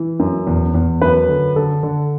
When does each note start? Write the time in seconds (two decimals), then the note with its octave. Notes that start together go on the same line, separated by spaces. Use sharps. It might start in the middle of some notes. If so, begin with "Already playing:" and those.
Already playing: E3
0.20 F#2
0.47 E2
0.74 E2
1.02 F#2 B4
1.29 D3
1.56 D3 A4
1.83 D3